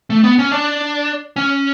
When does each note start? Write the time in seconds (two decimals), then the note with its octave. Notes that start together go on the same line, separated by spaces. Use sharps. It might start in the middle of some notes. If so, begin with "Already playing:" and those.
0.10 A3
0.24 B3
0.39 C#4
0.52 D4
1.36 C#4